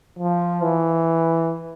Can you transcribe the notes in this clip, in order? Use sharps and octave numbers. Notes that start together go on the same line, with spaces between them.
F3
E3